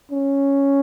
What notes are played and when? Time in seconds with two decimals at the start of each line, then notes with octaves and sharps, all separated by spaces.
0.12 C#4